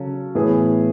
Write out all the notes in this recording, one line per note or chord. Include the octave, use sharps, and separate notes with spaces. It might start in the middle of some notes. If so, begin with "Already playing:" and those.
Already playing: C#3 F#3 C#4 F#4 A4
A2 E3 B3 E4 G#4